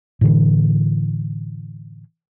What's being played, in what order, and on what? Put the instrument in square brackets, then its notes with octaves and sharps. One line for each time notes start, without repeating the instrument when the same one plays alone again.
[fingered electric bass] A2 D3 E3